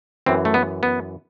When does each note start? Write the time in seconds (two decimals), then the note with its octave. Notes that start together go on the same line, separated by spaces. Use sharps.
0.26 F#2 E3 C4
0.45 A3
0.54 B3
0.83 B3